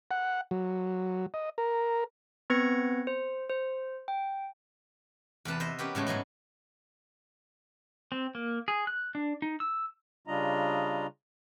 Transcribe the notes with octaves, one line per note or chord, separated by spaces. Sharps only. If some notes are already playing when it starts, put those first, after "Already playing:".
F#5
F#3
D#5
A#4
B3 C4 B4 G#6 A#6 C#7
C5
C5
G5
E2 C3 B4 A5
C5 D#5 E5
B3 C#4 G4 A#4
A2 C#3 G#3 A3
G#2 F#3 G#3 B3
C4
A#3
G#4
F#6
D4
D#4
E6
C#3 G3 D4 F4 D#5 A#5